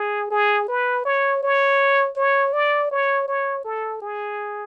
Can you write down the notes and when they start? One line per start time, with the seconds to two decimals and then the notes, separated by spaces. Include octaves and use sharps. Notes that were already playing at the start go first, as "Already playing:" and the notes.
Already playing: G#4
0.31 G#4
0.68 B4
1.05 C#5
1.43 C#5
2.17 C#5
2.53 D5
2.91 C#5
3.28 C#5
3.64 A4
4.02 G#4